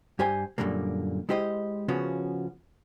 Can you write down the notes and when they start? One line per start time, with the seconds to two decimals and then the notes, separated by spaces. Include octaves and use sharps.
0.19 G2 G4 C5 G#5
0.58 F#2 A#2 D3 G3 A#3
1.29 G#3 E4 G4 C5 D#5
1.88 C#3 F3 B3 C#4 F#4